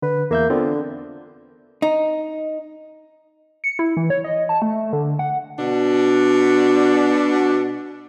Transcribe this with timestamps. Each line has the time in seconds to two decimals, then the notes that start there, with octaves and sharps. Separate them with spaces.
0.02 D3 B4
0.31 E2 A#3 E5 G6
0.50 D3 B3 C4 F4
1.82 D#4
3.64 C#7
3.79 E4
3.97 E3
4.10 C#5
4.24 D#5
4.49 A5
4.62 A3
4.93 D3
5.19 F#5
5.57 B2 D4